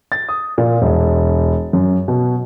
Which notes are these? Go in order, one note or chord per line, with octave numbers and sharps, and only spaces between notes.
A6
D#6
A#2
E1
F#2
B2